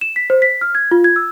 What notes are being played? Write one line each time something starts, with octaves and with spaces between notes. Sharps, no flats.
E7
B6
C5
B6
F6
G#6
F4
G#6
E6